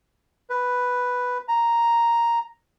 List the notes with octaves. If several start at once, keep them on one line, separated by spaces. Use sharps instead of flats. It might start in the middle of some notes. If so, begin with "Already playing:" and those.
B4
A#5